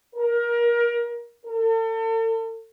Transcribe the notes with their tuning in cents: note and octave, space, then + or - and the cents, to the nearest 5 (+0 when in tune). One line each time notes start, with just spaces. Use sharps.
A#4 +25
A4 +40